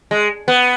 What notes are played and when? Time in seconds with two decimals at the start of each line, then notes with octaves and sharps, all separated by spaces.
0.11 G#3
0.48 B3